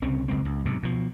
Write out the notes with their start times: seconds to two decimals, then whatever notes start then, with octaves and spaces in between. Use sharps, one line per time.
0.02 C2 C#3 C4 C#4
0.28 F#1 C#2 G#3 C4
0.45 C#2
0.65 B1 G#2 C3
0.83 B2 F3